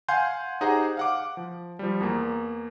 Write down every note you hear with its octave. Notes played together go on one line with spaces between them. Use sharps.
F5 F#5 G#5 C6 G6
D#4 G4 G#4 C5 F#5 A#5
F5 F#5 D6
F3
F3 G3
E2 A#3